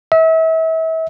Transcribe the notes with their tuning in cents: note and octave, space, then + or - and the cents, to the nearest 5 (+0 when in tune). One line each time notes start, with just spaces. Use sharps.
E5 -35